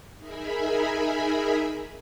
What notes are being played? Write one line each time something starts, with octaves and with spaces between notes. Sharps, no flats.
D#4 G#4 A#4 E5 G#5 B5